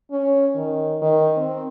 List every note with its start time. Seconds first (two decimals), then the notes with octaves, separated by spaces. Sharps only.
0.11 C#4
0.56 D#3
1.02 D#3
1.37 C4